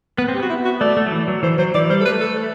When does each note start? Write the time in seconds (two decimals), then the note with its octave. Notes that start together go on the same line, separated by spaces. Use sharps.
0.18 B3 B4
0.28 C4
0.35 G4
0.40 B3 F#4
0.49 E4
0.65 F#4
0.81 A3 D5
0.97 A3
1.07 F#3
1.12 E3
1.28 F#3
1.43 E3 C5
1.58 F#3 C5
1.75 E3 D5
1.90 G3 C5
2.01 A4
2.05 A3 B4
2.21 A4